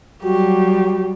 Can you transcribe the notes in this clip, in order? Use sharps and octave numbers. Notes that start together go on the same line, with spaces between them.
F#3 G3 F#4 G4